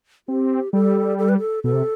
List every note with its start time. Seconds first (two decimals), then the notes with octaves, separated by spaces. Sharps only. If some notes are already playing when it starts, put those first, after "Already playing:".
0.28 C4 G4
0.73 G3 A4
1.19 A4
1.29 B4
1.38 A4
1.64 B2 A4
1.73 C3